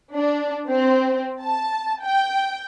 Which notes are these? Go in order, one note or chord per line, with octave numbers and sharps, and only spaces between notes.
D4
C4
A5
G5